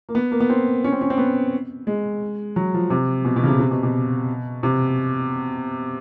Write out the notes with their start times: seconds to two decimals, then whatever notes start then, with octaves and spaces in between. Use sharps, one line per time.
0.09 A#3
0.15 B3
0.32 A#3
0.40 B3
0.50 C4
0.84 C#4
0.92 C4
1.01 C#4
1.10 C4
1.18 B3
1.87 G#3
2.56 F#3
2.74 F3
2.90 C3
3.25 B2
3.36 B2
3.44 C#3
3.48 C3
3.59 C3
3.71 B2
3.83 B2
4.63 C3